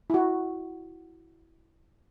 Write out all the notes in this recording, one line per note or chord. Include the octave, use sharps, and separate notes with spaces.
E4 F#4